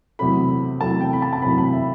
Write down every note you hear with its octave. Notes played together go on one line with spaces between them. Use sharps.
E2 C3 F#3 A3 B5
E2 C3 F#3 A3 A5
G5
B5
A5
A5
E2 C3 F#3 A3 B5
B5
E5